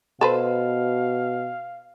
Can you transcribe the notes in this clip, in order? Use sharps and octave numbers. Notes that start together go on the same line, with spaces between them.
B2 A4 B4 C5 F5